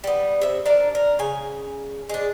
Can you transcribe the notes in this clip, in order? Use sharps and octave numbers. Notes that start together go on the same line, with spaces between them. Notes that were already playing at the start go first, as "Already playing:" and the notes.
G3 B3
C3 E5
D4 A#4 D5
A#4
C#3 G#5
G#3 D4